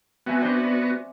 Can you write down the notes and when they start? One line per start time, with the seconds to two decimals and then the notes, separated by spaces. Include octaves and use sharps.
0.26 B3 C4 F#4 E5 G#5
0.41 C4 D4 C5